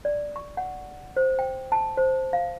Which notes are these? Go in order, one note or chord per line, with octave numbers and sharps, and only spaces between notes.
D5
C#6
F#5
C5
G5
A5
C5
F5